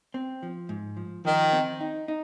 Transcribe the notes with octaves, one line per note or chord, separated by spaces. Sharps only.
C4
F3
G#2
F3
D#3 F3
C4
D#4
D#4